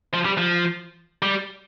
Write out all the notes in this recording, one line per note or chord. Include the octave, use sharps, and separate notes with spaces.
F3
G3
F3
G3